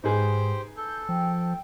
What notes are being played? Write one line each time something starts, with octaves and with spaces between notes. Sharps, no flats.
G#2 D#4 G4 G#4 B4 C5
A4 G6
F3 G5